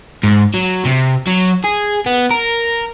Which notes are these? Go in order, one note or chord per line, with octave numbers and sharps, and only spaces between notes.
G#2
F#3
C3
F#3
G#4
B3
A#4